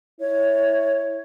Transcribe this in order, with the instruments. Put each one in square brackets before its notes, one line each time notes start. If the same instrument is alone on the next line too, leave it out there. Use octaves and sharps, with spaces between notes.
[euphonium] E4 [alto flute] C#5